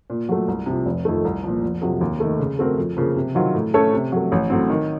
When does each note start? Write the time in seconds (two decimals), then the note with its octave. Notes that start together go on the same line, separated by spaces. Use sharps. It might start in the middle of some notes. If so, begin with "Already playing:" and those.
0.10 A#2
0.29 F#3 A3
0.48 C2
0.66 C3 F3
0.86 F1
1.05 F2 D#3 A3
1.25 C2
1.44 A#2 F3
1.63 F1
1.81 F2 C3 F#3
2.01 D#2
2.20 D#3 A3
2.39 C#3
2.59 A3 C4 F#4 A#4
2.78 F2
2.97 C#3 F3 A#3
3.16 C3
3.35 D#3 F#3 C4 F4
3.55 A2
3.74 A3 C#4 A4 C#5
3.93 C3
4.12 F#3 A3
4.32 A1
4.50 A2 F#3 C4
4.70 D#3